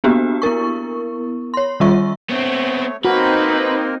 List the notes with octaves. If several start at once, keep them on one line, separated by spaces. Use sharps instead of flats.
A#3 B3 D4 F#4 G4
B3 E4 A#4 C#6
C#5 C6
D#3 G3 F4 E5 C#6
A3 B3 C4 C#5
A#3 C4 D#4 F#4 A#4 B4